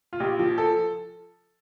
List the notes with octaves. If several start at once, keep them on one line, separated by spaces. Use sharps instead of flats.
F4
A#1 G4
F3
A4